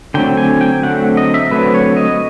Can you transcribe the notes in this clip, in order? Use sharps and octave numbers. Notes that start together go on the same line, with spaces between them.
D3 F#3 A3 C4 G5
G#5
G5
D3 F#3 A3 C4 F#5
D#5
E5
D3 F#3 A3 C4 B4
C#5
D#5